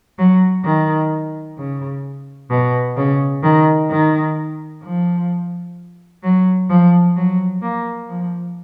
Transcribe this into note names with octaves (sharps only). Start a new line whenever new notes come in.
F#3
D#3
C#3
B2
C#3
D#3
D#3
F3
F#3
F3
F#3
A#3
F3